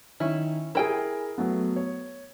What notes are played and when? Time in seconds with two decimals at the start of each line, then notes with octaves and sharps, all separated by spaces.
0.20 D#3 C#4 E4
0.75 E4 G#4 A#4 G5 G#5
1.38 F#3 A3 B3
1.76 C#5